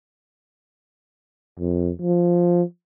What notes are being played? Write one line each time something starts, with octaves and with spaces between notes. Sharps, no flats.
F2
F3